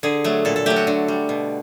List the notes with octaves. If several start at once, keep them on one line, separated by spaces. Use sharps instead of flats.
D3 G#4
F#3 A3
A#2 A4
A4
F#3 A3 G4
F#4
D3
G3
B2